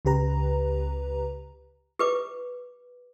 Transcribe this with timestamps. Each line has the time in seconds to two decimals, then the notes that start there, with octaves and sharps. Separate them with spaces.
0.05 C#2 C#3 G4 B4 A#5
1.99 G4 B4 D6